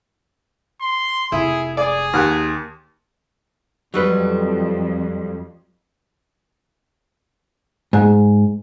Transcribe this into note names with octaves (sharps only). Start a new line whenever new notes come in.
C6
F1 E4 G#4
G#4 D5 D6
D#2 G4 F#5 F6
F2 F#3 G3 B4
G#2